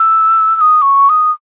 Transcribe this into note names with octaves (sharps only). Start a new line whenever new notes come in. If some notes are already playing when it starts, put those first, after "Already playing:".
Already playing: E6
E6
D#6
C#6
D#6